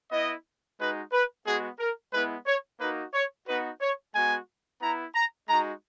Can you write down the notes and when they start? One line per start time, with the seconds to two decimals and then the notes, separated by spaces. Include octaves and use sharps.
0.12 B3 E4 D#5
0.79 G#3 D#4 F#4 B4
1.13 B4
1.45 G#3 B3 F#4 G#4
1.79 A#4
2.13 G#3 B3 E4 B4
2.46 C#5
2.80 A#3 D#4 F#4 B4
3.14 C#5
3.47 B3 D#4 F#4 B4
3.81 C#5
4.15 G#3 B3 F#4 G#5
4.82 B3 E4 A#5
5.15 A#5
5.49 G#3 D#4 F#4 A#5